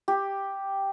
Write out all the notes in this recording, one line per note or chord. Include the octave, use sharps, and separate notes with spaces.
G4